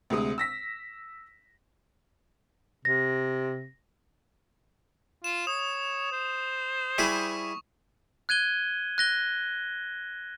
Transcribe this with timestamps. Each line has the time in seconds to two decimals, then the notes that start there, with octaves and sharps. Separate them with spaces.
0.10 D2 C3 G#3 D#6
0.38 E6 A#6 B6
2.85 C3 A#6
5.24 F4 E7
5.47 C#5 D#6
6.12 C5
6.98 G3 E4 G#4 C#6
8.29 F#6 G#6 D#7 G7
8.98 F#6 A#6 G7